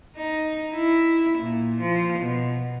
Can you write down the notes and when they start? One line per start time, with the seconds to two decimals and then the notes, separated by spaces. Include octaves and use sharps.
0.17 D#4
0.74 E4
1.38 A#2
1.80 F3
2.18 B2